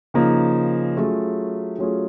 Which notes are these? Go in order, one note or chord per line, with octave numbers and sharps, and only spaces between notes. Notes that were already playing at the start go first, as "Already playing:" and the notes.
C#3 F3 A#3 D#4
F#3 A3 C#4 F4 G#4
F#3 A3 C#4 F4 G#4